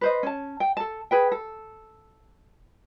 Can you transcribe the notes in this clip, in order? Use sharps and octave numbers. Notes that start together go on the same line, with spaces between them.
B4 C5 D#5
C#4 A5
G5
A4 A5
G#4 B4 G5
A4